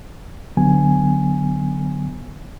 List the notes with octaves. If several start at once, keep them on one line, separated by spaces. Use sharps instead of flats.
C#2 D3 F#3 B3 G#5